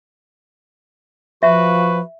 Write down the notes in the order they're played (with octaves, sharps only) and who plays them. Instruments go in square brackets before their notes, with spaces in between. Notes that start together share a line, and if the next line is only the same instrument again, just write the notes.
[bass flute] F3 [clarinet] F#4 [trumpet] B4 [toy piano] E5